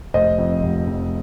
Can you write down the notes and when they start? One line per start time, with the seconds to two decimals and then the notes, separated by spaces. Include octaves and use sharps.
0.14 F1 C5 D#5
0.38 F2
0.63 F1
0.87 F2